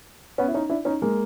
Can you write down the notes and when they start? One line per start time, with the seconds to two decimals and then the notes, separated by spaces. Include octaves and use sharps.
0.38 B3 C#4
0.48 E4
0.54 C#4 D#4
0.69 D4 E4
0.85 C#4 D#4
1.02 G#3 A#3